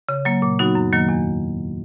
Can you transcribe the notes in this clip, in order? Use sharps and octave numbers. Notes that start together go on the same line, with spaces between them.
C#3
F#3 A#3
A#2
F#3 B3 D#4 F#4
F#2
D#3 F#3 A#3
E2